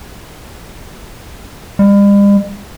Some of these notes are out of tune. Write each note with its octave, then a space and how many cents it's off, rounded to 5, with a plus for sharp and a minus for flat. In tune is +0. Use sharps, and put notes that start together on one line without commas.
G3 +45